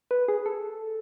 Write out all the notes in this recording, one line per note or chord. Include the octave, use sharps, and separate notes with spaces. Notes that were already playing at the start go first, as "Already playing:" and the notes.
B4
G#4
A4